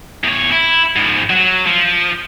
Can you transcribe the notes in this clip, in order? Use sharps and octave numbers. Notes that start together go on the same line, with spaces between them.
E2 C#5
E4
G#2 F3
F#3
F3